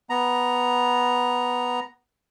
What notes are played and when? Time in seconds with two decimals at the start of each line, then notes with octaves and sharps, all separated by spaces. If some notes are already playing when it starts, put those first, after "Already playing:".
0.10 B3 A#5